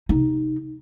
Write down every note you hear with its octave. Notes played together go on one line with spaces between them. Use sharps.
C3 D#4